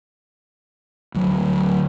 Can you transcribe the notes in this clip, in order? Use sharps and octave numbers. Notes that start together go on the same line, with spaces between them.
D2 F#3